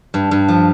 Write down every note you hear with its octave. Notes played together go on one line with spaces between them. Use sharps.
G2
G2
F3